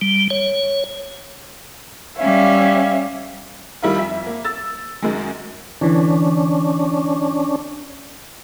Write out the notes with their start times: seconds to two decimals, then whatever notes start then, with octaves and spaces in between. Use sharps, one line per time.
0.01 G3
0.30 C#5
2.18 G3 C#4 E5 F5
3.82 D#3 G3 E4 F4
3.96 F2 E5
4.26 A#3
4.45 E6 A6
5.02 F#2 D#3 G#3
5.81 D3 E3 C#4 D4